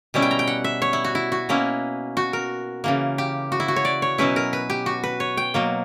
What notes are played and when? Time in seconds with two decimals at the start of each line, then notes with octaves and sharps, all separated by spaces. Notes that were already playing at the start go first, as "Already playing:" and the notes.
0.14 B2 G3 C#4 E4
0.22 G5
0.31 A#5
0.39 G5
0.47 F#5
0.64 E5
0.82 C#5
0.93 E4
1.04 F#4
1.15 E4
1.32 F#4
1.49 B2 A#3 C#4 E4
2.17 F#4
2.33 A#4
2.84 C#3 E3 A#3
3.18 G4
3.52 F#4
3.60 E4
3.68 F#4
3.76 C#5
3.85 D5
4.02 C#5
4.18 B2 F#3 C#4 E4 B4
4.36 A#4
4.53 B4
4.70 G4
4.86 F#4
5.04 B4
5.20 C#5
5.37 G5
5.54 B2 F#3 A#3